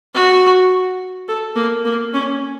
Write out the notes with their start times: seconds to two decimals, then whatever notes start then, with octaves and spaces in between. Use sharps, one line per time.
0.14 F#4
1.28 A4
1.56 A#3
1.85 A#3
2.13 C#4